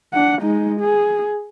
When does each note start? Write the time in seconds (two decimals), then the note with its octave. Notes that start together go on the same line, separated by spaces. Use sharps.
0.14 D4 F#5
0.42 G#3 D#4
0.80 G#4